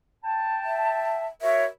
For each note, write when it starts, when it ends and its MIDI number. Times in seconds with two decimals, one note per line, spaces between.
0.23 1.26 79
0.23 1.26 81
0.65 1.27 76
1.42 1.65 66
1.42 1.65 70
1.42 1.65 73
1.42 1.64 76